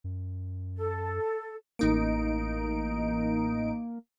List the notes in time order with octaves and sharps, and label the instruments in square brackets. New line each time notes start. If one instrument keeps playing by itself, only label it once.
[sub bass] F#2
[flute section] A4
[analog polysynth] A1 D#4 D7 [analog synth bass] A#3